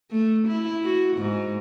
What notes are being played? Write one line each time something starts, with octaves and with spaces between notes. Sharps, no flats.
A3
E4
F#4
G#2